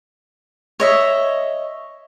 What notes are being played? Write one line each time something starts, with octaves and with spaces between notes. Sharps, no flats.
C#5 D#5 E5